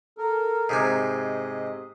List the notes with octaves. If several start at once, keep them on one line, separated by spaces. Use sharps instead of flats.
A4 A#4
G#2 C3 G#5
D#5